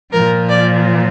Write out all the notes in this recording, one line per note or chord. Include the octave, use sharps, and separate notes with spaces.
A#2 F3 A#4
D5